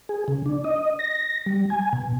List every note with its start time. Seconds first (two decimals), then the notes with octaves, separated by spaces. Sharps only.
0.09 G#4
0.28 C#3
0.46 D4
0.64 D#5
0.99 A#6
1.46 G3
1.70 G#5
1.93 B2